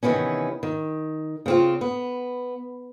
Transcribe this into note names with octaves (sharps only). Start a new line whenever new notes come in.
C3 D#3 E3 B3 C#4
D#3
C#3 C4 F4
B3